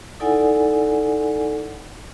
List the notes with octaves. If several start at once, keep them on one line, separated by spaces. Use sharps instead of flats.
D#4 E4 A4 D5 F#5 G#5